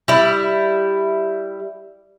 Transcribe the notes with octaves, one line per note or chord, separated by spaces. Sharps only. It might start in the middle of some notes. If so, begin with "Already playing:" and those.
G3 E4